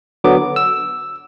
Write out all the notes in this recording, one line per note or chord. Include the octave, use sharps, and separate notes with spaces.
D3 F#3 B3 D6
E6